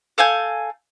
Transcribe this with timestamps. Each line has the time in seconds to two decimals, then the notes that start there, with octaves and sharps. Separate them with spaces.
0.18 A4 F5 G#5 G6